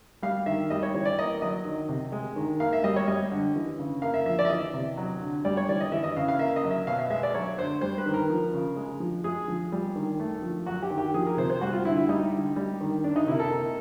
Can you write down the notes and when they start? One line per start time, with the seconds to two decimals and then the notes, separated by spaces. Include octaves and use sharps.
0.22 G3 F5
0.46 D#3 E5
0.70 G3 D#5
0.83 C#5
0.94 E3 C#5
1.05 D5
1.18 A#3 D#5
1.42 F#3 D#5
1.65 D#3
1.89 C3
2.12 G#3
2.36 D#3
2.60 A#3 F5
2.73 E5
2.84 G3 D#5
2.96 C#5
3.07 G3 D#5
3.31 D3
3.56 E3
3.79 C#3
4.02 A#3 F5
4.14 E5
4.26 F3 E5
4.39 D5
4.45 E5
4.49 E3 D#5
4.74 C3
4.97 F#3
5.21 D3
5.45 G3 D5
5.57 C#5
5.69 E3 D5
5.80 D#5
5.92 E3 E5
6.04 D#5
6.17 C#3 F5
6.28 F5
6.39 A#3 E5
6.56 D#5
6.64 F#3
6.71 E5
6.87 B2 F5
6.99 E5
7.10 G#3 E5
7.23 D5
7.34 F#3 C#5
7.58 D3 C5
7.81 G3 C5
7.98 B4
8.06 D#3
8.14 A#4
8.30 F3
8.53 C#3
8.76 G#3
9.00 F3
9.24 G#3 G#4
9.48 F3
9.72 G3
9.96 D#3
10.20 A3
10.42 F3
10.66 F#3 F#4
10.82 G4
10.90 D#3
10.98 G4
11.14 F3 G#4
11.26 A#4
11.37 C3 C5
11.50 C5
11.61 G3 F#4
11.73 F4
11.85 D3 E4
11.97 E4
12.08 G3 D#4
12.33 D3
12.56 G3
12.81 D#3
13.04 D#3 D4
13.16 D#4
13.27 C3 E4
13.35 A#4
13.40 A4
13.51 A#3